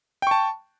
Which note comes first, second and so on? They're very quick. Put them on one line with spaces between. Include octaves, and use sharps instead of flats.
G5 C#6 A5